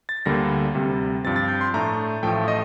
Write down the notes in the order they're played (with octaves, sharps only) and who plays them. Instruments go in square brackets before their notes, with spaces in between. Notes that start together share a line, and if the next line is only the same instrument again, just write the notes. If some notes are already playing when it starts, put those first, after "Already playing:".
[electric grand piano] A6
D2 D3 G3 A#3 A#6
D2 C3 G3
G2 F3 C4 A6
A6
G6
C6
A2 A3 D4 A#5
A1 A2 F3 A3 G5
D#5